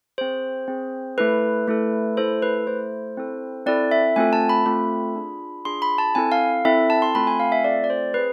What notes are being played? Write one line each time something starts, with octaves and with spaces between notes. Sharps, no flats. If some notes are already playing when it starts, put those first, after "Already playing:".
C4 G#4 C5
C4 G#4
A3 E4 A4 B4
A3 E4 A4
A3 E4 A4 C5
B4
A3 E4 A4 C5
C4 E4 A4
C4 E4 A4 D5
E5
A3 C4 F4 A4 G#5
A5
B5
A3 C4 F4 A4 B5
D4 F4 G#4
D4 F4 G#4 C6
B5
A5
C4 E4 A4 G#5
F5
C4 E4 A4 E5
A5
C6
A3 C4 F4 A4 B5
G#5
F5
E5
A3 C4 F4 A4 D5
D5
C5
C4 G#4 B4